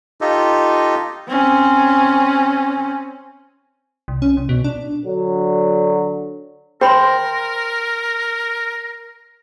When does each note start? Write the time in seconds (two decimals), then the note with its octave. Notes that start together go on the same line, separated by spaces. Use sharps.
0.21 D#4 F4 G4 A4 D#5
1.28 C4 C#4
4.08 C2
4.22 C#4
4.37 C2
4.49 B2
4.64 D4
5.06 D3 F#3
6.81 A#4 C5 G5 B5 C6